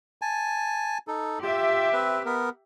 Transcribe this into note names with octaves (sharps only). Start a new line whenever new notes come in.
G#5 A5
D#4 A4
F4 G4 E5
C4 B4
B3 A#4